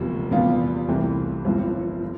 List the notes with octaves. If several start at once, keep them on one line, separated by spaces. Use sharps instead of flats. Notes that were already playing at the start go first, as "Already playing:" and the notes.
Already playing: E1 D2 C3 F3 B3
E2 C3 G3 B3 F4
C2 C3 E3 A3 C4
G1 G2 F3 C4 E4
D3